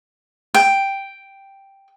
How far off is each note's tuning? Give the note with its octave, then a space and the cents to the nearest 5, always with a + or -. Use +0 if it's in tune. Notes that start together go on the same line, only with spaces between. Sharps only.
G5 +0